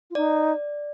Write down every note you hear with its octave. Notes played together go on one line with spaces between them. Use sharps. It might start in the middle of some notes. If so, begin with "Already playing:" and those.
F4
D#4 D5